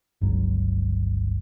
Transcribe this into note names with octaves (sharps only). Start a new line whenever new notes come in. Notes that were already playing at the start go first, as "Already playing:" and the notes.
G1 C#2 F#3